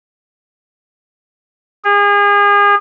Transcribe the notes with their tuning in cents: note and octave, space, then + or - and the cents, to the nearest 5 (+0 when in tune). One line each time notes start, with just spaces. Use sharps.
G#4 -35